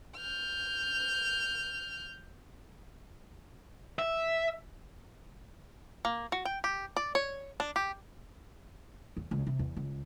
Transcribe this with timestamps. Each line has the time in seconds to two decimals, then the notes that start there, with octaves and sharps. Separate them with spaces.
0.17 F6 G6
3.99 E5
6.05 A#3
6.32 F#4
6.45 G5
6.64 G4
6.97 D5
7.15 C#5
7.60 D4
7.76 G4
9.17 E2
9.31 C#2
9.47 C3
9.59 E2
9.76 C#2